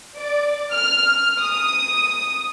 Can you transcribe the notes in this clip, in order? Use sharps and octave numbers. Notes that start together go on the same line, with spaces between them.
D5
F6
D#6